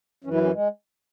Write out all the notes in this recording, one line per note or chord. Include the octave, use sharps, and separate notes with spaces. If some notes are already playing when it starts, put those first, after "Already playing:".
F#2 E3 C#4
E4
C#4
G#3